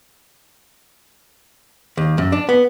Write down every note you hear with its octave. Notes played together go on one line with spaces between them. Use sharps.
D#2
F#2
D4
B3